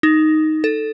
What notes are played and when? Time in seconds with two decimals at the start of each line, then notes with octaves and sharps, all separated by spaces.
0.03 D#4
0.64 A4